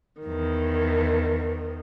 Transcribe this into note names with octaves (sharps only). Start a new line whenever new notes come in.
E2 D#3